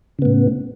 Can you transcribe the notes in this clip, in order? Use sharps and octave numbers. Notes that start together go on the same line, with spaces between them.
A2 C#3 B3